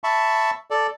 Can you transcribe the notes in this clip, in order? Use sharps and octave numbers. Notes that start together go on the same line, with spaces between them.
E5 A5 B5 C#6
A4 D5